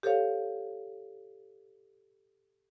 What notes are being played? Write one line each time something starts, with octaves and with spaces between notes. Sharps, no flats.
G4 A4 C5 C#5 F5